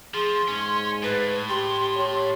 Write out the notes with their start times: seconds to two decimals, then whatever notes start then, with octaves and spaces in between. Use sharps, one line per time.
0.14 F3 G#4 C6
0.48 G#2 C#4
1.03 A2 B4
1.49 G4 C6
1.98 G4 C#5